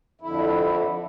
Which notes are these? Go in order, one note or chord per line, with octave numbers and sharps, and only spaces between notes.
F2 D3 E4